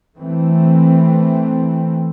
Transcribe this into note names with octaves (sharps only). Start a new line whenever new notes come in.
E3 A3 C4